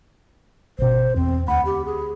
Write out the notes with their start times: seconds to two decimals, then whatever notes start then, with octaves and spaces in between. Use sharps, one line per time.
0.79 G#1 B2 C5
1.16 E2 C4
1.48 D2 F#5 B5
1.66 G4
1.86 G#4